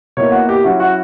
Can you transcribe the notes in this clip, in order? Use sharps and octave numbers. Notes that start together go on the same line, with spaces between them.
B2 A#3 E4 C#5
F#4
G4
F#3 C#4 E4 F#4
F#4